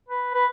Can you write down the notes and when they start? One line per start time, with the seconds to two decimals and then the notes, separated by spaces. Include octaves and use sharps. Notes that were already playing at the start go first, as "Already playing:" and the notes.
0.09 B4
0.34 B4